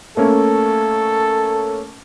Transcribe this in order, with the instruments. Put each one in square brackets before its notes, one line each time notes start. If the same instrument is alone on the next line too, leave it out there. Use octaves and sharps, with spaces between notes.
[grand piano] A3 A#3 C#4 [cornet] A4